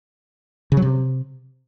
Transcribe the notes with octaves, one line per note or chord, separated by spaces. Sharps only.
C#3
F#3
C3